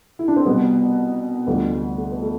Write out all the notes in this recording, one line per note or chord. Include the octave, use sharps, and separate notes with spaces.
E4
D4
C4
C2 B2 G3 B3
D2 D3 F3 G3 B3
G3
A3
B3
A3